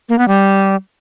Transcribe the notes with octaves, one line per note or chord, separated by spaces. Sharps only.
A#3
B3
G3